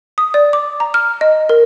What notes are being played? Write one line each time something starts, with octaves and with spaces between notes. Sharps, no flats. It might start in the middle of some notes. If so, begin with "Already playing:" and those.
D#6
D5
D6
A#5
F6
D#5
A#4